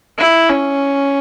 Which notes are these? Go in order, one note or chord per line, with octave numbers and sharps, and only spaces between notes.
E4
C#4